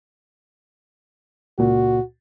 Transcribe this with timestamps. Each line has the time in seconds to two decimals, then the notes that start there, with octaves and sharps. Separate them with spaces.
1.59 C#2 A#2 F#4